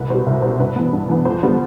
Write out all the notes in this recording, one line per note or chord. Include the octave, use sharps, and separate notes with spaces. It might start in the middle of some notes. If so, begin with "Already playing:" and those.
Already playing: C2 B4
B2 G3 C5
C2 E5
B2 G3 C5
G2 B4
E3 B3
G2
E3 B3
F2 C5
D3 G3 B3